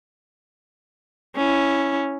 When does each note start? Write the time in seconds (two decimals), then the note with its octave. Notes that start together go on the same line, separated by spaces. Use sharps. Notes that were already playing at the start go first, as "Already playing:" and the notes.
1.36 C#4 E4